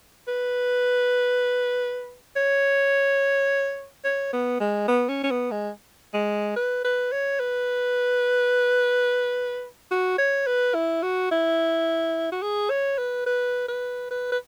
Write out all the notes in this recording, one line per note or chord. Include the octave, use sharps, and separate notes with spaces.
B4
C#5
C#5
B3
G#3
B3
C#4
C#4
B3
G#3
G#3
B4
B4
C#5
B4
F#4
C#5
B4
E4
F#4
E4
F#4
G#4
C#5
B4
B4
B4
B4
B4